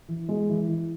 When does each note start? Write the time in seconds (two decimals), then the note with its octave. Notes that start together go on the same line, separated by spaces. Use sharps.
0.08 E3
0.29 G#3
0.49 E3
0.69 E3